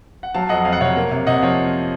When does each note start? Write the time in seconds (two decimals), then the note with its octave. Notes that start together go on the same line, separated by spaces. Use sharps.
0.23 F#5
0.35 F#3 F5 A5
0.49 F2 D#5 F#5
0.65 F2 F5
0.73 F#5
0.80 C3 C#5 F5
0.96 A#3
1.11 C3
1.27 C3 D#5 F#5
1.42 F3 C#5 F5